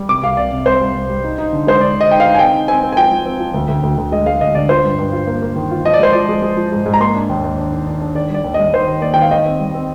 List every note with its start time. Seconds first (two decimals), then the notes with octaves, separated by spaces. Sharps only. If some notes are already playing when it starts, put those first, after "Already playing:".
Already playing: G3
0.09 C3 D6
0.23 C2 F5
0.37 C2 D5
0.52 C3
0.66 C2 C5
0.81 C2
0.95 C2
1.10 G3
1.24 D#4
1.38 D#4
1.53 D3
1.67 G#3 C5
1.81 D3 D5
1.96 D3 D#5
2.10 D#4 G5
2.20 F5
2.25 D#4
2.34 G#5
2.39 C4 G5
2.53 D#4
2.68 C4 G#5
2.83 C4
2.92 G#5
2.97 F3 G5
3.11 F3
3.26 C4
3.39 F3
3.54 D2
3.68 D2
3.83 D2
3.98 D2
4.12 G#3 D#5
4.26 G#3 F5
4.41 D2 D#5
4.55 D3 D5
4.69 F4 C5
4.84 G2
4.99 G2
5.12 F4
5.27 A#3
5.42 A#3
5.56 D#3
5.71 F4
5.85 F3 D#5
5.94 D5
5.99 G#3 C5
6.13 F3 D5
6.29 G#3
6.42 G#3
6.57 F3
6.72 G#2
6.86 G#2
6.94 A#5
7.00 A#3 C6
7.15 D4
7.29 D#2
7.44 D#2
7.58 D4
7.72 D#3
7.87 D4
8.01 D4
8.15 D#3 D5
8.30 G3 D5
8.44 D#2
8.54 G3 D#5
8.74 D#3 C5
8.87 D#2
9.01 A#3 D5
9.14 D#3 G5
9.22 F5
9.31 D#3 D#5
9.46 C4
9.60 G3
9.74 C4